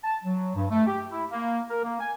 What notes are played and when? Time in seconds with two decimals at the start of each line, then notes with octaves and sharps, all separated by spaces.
0.04 A5
0.24 F#3
0.55 G2
0.70 A3
0.87 G4
1.12 E4
1.31 A#3
1.70 A#4
1.84 A#3
2.00 G#5